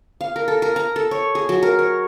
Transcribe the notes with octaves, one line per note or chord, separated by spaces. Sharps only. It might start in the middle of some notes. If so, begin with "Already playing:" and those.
F5
A#4
A4
A#4
A#5
A4
C#5
G#4
F#3
A#4
C#5